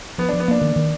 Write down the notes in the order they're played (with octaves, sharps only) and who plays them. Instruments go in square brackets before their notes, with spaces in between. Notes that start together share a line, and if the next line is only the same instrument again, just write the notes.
[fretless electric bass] F3 [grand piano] B3
[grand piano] D4
[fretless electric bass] F3
[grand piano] B3
[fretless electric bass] A#3 [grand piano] D4
[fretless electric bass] D#3
D#3